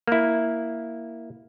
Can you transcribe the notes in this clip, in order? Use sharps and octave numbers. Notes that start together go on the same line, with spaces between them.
A#3 E4